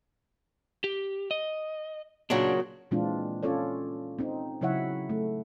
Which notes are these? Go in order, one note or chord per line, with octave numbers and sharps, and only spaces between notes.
G4
D#5
A#2 C#3 F#3 D4
A#2 E3 G#3 C4 D4 F4
C#4 F4 A4 C#5 D5
C4 D#4
C#3 F#3 E4 C#5 E5 F#5
A3